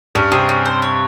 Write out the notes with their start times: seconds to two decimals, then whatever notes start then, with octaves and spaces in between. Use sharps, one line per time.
0.15 G2 G3 C#4
0.32 C3 C4 G#4
0.49 C#4
0.65 C5
0.82 C#5